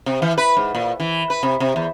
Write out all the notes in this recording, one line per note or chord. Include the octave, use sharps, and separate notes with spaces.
C3
E3
B4
G#2
A#2
E3
B4
C3
C3
E2